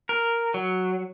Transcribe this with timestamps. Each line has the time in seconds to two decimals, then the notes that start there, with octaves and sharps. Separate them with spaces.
0.09 A#4
0.54 F#3